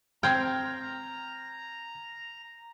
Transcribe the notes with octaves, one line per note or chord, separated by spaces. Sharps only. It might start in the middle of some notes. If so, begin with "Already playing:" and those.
C4 G5 A#5 F6 G6 G#6